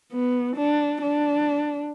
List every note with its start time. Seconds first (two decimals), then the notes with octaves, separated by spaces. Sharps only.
0.12 B3
0.57 D4
1.02 D4